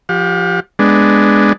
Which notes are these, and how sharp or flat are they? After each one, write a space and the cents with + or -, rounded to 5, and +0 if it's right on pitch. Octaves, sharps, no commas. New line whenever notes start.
F3 +0 G4 +0 F5 +45
G#3 +0 B3 +0 D4 +0